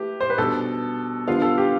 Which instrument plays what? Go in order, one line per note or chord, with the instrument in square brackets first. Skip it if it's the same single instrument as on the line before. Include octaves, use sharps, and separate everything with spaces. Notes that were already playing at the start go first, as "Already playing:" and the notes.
Already playing: [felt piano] A3 E4 B4 [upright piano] G4
[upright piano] C5
B4
[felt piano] B2 G3 D4 [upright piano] A4
[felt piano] D3 G3 B3 [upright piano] F4 F5
[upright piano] A4
G4